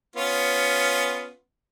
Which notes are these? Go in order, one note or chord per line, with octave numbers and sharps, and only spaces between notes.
B3 C#4 F4